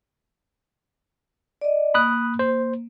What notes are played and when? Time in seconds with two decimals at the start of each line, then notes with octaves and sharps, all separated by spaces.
1.61 D5 D#5
1.94 A#3 B5 D#6 F#6
2.39 C5